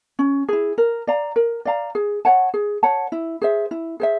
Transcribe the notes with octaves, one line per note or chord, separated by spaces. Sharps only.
C#4
E4 G#4
A#4
D5 F5 A#5
A#4
D5 F5 A#5
G#4
C#5 F#5 A5
G#4
C#5 F#5 A5
E4
G#4 C5 E5
E4
G#4 C5 E5